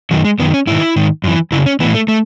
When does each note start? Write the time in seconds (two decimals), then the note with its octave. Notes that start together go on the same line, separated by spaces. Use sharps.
0.11 F#2 D#3 F#3
0.25 G#3
0.39 F#2 D#3 B3
0.54 C#4
0.67 G#2 D#3 E4
0.96 G#2 D#3
1.24 F#2 E3
1.52 F#2 C#3 E4
1.66 C#4
1.80 A2 E3 B3
1.95 A3
2.08 A3